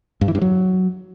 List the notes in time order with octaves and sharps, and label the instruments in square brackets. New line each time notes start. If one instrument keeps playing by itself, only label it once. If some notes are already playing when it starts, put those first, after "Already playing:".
[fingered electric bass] G2
E3
G2
F#3